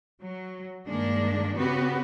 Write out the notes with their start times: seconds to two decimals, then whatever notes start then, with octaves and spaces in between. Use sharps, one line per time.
0.21 F#3
0.87 G2 D#3 G#3 A#3 D4
1.55 C#3 B3 C4 F#4 G4 B4